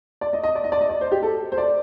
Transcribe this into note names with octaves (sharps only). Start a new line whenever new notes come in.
D5
D#5
D#5
D5
D#5
D5
D#5
D5
C5
G4
A4
C5
D5